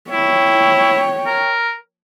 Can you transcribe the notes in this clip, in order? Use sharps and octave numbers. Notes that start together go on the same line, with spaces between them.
E4 C#5 G5
A#4